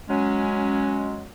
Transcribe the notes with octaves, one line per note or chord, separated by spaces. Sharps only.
F#3 G#3 C#4